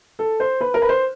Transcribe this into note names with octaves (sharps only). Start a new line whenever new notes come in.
A4
C5
B4
A#4
B4
C5